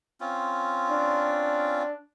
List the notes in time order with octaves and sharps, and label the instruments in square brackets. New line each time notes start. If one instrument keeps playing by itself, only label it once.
[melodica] C4 C#4 F4
[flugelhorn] D4